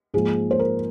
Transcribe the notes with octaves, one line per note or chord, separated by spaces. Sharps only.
G#2 F3 A#3 G#4
C5
A#4